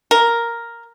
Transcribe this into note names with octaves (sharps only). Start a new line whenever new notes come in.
A#4